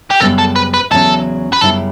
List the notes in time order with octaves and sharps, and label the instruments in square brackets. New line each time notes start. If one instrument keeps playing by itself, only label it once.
[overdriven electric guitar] G4
[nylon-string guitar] F#2 C#3 G3 B3 [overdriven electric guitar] A4
[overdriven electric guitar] A4
B4
B4
[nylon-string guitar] E2 C#3 F#3 C#4 [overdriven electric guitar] A4
[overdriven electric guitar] B4
[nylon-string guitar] F#2 C#3 G3 B3 E4 [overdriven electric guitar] A4